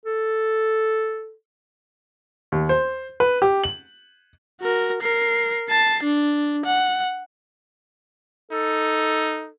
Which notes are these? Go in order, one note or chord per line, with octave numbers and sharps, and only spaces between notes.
A4
D#2
C5
B4
G4
F#7
F#4 A#4
A#4 C7
A5 C7
D4
F#5
D#4 A4